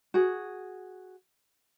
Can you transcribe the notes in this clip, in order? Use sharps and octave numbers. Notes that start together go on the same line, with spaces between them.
F#4 G#4